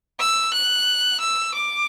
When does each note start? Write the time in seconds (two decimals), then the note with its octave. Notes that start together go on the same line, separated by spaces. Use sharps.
0.20 E6
0.53 F#6
1.20 E6
1.54 D6